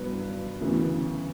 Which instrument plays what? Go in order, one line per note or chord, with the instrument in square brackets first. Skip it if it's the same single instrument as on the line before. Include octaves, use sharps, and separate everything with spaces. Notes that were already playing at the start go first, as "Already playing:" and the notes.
Already playing: [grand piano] G2 F#3 B3 B4
D2 C#3 E3 B3